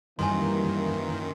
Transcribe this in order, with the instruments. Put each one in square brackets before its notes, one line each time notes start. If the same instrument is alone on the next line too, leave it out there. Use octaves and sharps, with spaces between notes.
[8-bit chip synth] F#2 D#3 [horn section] E3 A#3 [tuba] G3 [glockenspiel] G#5 C6